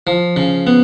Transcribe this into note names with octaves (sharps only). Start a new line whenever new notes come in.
F3
C#3
B3